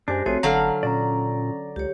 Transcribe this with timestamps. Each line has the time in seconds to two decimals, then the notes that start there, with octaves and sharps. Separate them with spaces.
0.08 F#2 G#3 D4 G4 C5 G#5
0.26 A#1 A3 C4 F4 F#4 G#4 C#5
0.43 G1 D3 F#3 F5 F#5 A5 A#5 F6
0.83 A#2 C#4 D5 A#5
1.76 C#2 G4 C#5